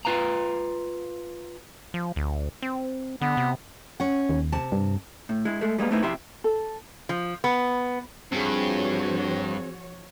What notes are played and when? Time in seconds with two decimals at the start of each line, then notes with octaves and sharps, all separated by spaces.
0.05 F4 B4 F5 A#5
1.94 F3
2.16 D2
2.62 C4
3.21 D3 B3
3.37 C3
4.00 C#4 F#5
4.29 D#2
4.52 C3 A5
4.72 G2
5.29 A2
5.45 G#3 E4
5.61 G#3 A3
5.79 G3 G#3 A#3 B3
5.91 A3 B3 C4 D#4 E4
6.02 F2 C3 E4 G4 E5 C6
6.44 A4
7.09 F3
7.44 B3
8.32 G2 F3 C4 F#4 G#4 C#5